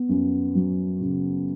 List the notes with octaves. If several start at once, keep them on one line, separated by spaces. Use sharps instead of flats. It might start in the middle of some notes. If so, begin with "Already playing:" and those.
Already playing: B3
F#2
F#3
C#3